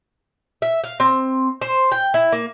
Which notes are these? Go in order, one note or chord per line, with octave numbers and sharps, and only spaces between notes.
E5
F5
C4
C5
G5
E4
A#3